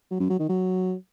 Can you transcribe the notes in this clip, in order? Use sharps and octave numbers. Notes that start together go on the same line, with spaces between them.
F#3
F#2
F#3
D#3
F#3